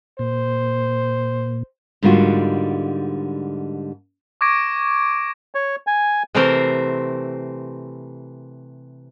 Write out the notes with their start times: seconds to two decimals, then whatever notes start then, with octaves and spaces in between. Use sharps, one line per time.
0.19 A#2 C5
2.03 G#2 D3 G3 A#3 F4 F#4
4.41 C#6 D6 G#6 A#6 D7
5.55 C#5
5.87 G#5
6.35 C3 E3 A3 C4 A#4 C5